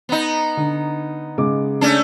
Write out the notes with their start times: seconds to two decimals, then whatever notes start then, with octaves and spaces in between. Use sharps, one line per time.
0.09 B3 D#4
0.57 D3
1.38 C#3 G#3 D6
1.81 A3 C#4 D4